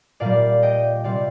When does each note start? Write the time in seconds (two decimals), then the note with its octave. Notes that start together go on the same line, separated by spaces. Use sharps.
0.20 A#2 G3 D5 F5
0.62 D#5 G5
1.04 C3 G3 D5 F5